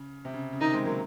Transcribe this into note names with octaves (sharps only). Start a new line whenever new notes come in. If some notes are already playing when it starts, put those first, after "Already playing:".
Already playing: C#3
C3
C#3
C#3
C3 D#3 D#4
G#3 C4
F#3 A#3